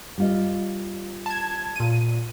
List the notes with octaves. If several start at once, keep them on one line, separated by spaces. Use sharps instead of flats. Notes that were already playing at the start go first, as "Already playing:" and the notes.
G3 F4 D#5
A5 G#6
A#2 D#7